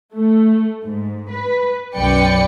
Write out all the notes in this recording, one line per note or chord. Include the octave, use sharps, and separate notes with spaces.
A3
G#2
B4
B1 F#2 B4 D5 G5 C#7